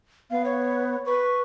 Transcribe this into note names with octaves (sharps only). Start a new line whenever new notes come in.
B3 F5
C#5
B4 C#6